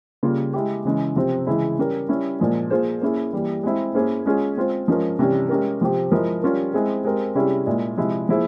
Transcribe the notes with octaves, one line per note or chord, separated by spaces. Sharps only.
C#3 G3 A#3 F4
G#3 E4 G4
C#3 E3 G#3 C#4
C3 F3 C4
C#3 E3 G#3 E4 G#4
G3 C#4 G4 A#4
G3 C#4 E4
A#2 F3 G#3
A#3 F4 G#4 C5
A#3 C#4 E4 G#4
E3 G3 A#3
G#3 C4 E4
A#3 C#4 E4 G#4 C5
G#3 C#4 F4 G#4
G#3 C4 F4 C5
F3 G#3 C#4 F4 A#4
C3 E3 G3 C#4
G#3 C#4 G4 A#4
C3 F3 C4 G4
F3 G#3 E4 A#4
G3 C#4 F4 A#4
G#3 C4 E4 G#4
G#3 C4 G4 A#4
C3 G3 C#4 E4 G#4
A#2 G#3 E4
C3 F3 G#3 E4
F3 A#3 E4 G#4 C5